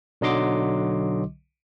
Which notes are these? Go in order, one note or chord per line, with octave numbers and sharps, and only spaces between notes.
B1 D3 F#3 D#5 C6 D6